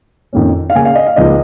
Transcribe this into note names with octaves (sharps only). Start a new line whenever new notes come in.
F2 D#3 A#3 C#4
F5
C#3 A#3 C#4 G#5
F5
D#5
F5
C#2 C#3 F3 A#3 D#4 D#5